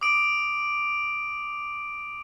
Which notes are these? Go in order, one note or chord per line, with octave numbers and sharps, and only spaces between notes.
D6 D#6 D7